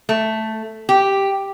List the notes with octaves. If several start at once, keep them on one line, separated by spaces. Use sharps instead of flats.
A3
G4